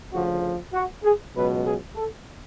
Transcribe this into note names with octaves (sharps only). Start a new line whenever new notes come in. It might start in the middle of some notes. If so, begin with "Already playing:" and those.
D2 C#3 F3 F#4
F#4
G#4
C#2 B2 F#3 B4
G#4
A4